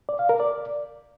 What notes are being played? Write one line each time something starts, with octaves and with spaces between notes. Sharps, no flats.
D5
F5
A#4
D5